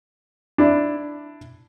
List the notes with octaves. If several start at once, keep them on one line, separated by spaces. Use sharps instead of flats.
D4 E4